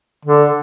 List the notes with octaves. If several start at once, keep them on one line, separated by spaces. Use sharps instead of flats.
D3